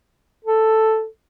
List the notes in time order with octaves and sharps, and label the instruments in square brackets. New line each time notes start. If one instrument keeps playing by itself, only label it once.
[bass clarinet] A4